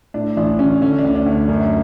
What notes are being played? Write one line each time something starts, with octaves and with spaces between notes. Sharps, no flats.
A2 D4
A1 D4
A1 C#4
D3 C#4
D4
D2
D4
D2
D4
F#2